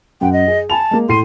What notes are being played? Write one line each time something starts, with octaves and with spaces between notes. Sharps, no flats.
F#2 F#5 G5
D#5
G#4
G#5 A5 B5 F7
G#3 A#3
A2 C6 C7 D#7